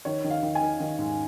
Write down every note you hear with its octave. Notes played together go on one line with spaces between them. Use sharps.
D#3 C#5
D#3
F5
D#3
G#5
D#3
D#3
G#2